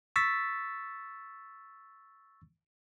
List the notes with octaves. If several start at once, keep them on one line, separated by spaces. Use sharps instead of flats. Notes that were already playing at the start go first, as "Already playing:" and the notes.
C#6 E6 A6 B6